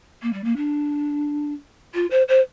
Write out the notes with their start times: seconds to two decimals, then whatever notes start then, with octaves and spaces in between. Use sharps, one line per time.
0.22 A#3
0.33 G3
0.44 A#3
0.56 D4
1.94 F4
2.10 C5
2.28 C5